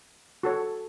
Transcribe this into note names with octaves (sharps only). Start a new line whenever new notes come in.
F#4 A4 C#5